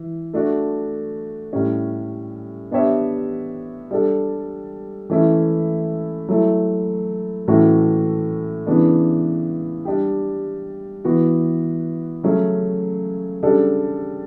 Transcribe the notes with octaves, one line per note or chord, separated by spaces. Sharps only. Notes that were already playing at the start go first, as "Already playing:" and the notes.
Already playing: E3
A3 D4 F#4
A2 G3 C#4
B3 D4 G4 C#5 E5
G3 D4 A4
E3 A3 C#4 E4
F#3 A3 E4
A2 E3 A3 C#4 F#4
C#3 E3 B3 D4
G3 D4 G4
E3 B3 F#4
C#3 F#3 A3 C#4
C#3 G3 D4 A4